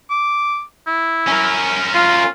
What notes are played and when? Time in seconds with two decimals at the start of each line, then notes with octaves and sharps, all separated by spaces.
0.10 D6
0.87 E4
1.28 C#4 A#4
1.94 F4